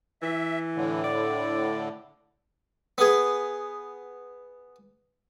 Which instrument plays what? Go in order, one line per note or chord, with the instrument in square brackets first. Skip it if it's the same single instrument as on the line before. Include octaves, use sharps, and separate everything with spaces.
[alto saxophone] E3 [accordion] E5
[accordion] A2 D3
[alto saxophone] D5
[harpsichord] B3 G#4